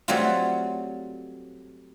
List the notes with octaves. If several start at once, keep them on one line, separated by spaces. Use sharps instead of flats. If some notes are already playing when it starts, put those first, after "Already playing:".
F#3 G3 A3 C4 F4